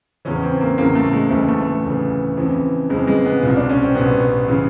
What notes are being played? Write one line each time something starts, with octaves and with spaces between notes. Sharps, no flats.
E2 C#3 E3 C#4
C4
A#3
E2 C#3 E3 A#3
A3
G#3
D2 C#3 E3 A3
A3
D2 C#3 E3
F2 C#3 E3
F2 C#3 E3 G#3
G#3
B3
C2 B2 F4
D4
C#4
C4
C2 B2 B3
C#3 E3